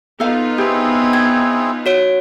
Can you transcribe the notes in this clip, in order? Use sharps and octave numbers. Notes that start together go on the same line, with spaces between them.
B3 D#4 F4 A4 F5
C4 E4 G4 G#4 B4
G5 G#6
F#4 C#5 D7